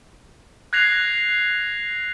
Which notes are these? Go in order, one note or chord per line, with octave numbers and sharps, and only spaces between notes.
F#6 G#6 A#6 C7 F7